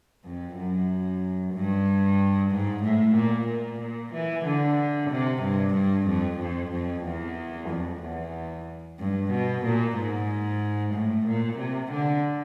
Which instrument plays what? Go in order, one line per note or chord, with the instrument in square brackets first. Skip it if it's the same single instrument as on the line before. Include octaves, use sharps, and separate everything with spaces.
[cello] F2
F#2
G2
G#2
A2
A#2
A#2
A#2
E3
D3
C3
G2
G2
F2
F2
F2
E2
F2
E2
G2
B2
A#2
G#2
A2
A#2
C3
D3